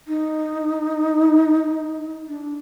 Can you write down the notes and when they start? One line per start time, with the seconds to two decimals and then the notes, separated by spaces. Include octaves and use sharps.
0.08 D#4
2.29 D4